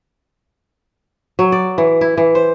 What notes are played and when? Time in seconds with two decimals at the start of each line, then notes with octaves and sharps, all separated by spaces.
1.39 F#3
1.52 D5
1.78 E3
2.01 E4
2.18 E3
2.35 C5